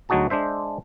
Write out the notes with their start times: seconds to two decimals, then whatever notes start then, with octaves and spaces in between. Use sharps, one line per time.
0.09 D2 F#3 D#4 F#4 G#4 A5
0.30 G#3 D4 C5 E5